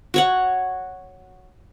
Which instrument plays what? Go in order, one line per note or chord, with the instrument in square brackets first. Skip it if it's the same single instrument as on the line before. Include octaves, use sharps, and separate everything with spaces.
[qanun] F#4 C#5 F#5